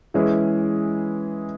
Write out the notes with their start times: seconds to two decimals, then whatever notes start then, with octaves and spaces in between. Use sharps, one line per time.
0.14 E3 G#3 C#4 E4 G#4